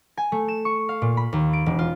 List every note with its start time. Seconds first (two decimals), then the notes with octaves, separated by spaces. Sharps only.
0.17 G#5
0.32 A3
0.48 E7
0.65 C#6
0.89 F5
1.02 A#2
1.17 B5
1.33 D#2
1.53 D7
1.66 E1
1.79 F4